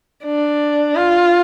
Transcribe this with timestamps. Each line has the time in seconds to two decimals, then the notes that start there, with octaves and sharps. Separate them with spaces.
0.25 D4
0.96 F4